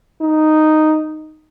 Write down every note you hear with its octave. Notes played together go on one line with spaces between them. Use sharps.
D#4